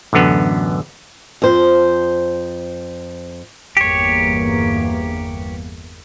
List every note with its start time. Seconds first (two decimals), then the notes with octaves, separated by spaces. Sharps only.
0.13 A1 F#2 D3 B3
1.42 F2 C5
3.77 G1 E2 A#3 G4 C#5